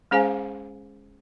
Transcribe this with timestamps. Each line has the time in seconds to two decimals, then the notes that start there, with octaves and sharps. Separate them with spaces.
0.11 G#3 C#4 G#4 C5 F5 G#5